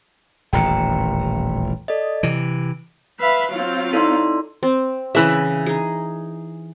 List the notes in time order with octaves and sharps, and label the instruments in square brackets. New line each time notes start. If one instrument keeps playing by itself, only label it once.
[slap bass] D#1 A1 E2 [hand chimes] G5 A#5 C#7
[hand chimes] A4 D5 D#5
[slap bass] C3 E3 [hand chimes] D7
[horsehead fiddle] B4 B5 [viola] E5 F5
[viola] F#3 F5 [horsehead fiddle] C4 F4
[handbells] D#4 A4 [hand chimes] E4 D5 C6
[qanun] C4
[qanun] C#3 B5 [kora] E3 E5
[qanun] D#4 G#4